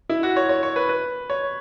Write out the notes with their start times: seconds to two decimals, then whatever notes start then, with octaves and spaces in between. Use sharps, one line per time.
0.10 E4
0.23 F#4
0.36 C#5
0.49 C#5
0.63 C#5
0.76 B4
0.89 B4
1.30 C#5